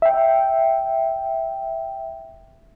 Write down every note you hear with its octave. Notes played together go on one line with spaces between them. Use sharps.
E5 G5